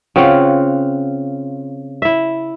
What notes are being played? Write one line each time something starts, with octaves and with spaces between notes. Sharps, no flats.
C#3 C4 F4 F#5
E4 E5